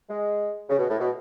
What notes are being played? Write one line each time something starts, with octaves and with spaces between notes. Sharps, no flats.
G#3
C#3
B2
A2
B2